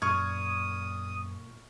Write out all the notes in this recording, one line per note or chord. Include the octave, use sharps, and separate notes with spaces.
F#2 A#2 C#6 D#6 F6 G#6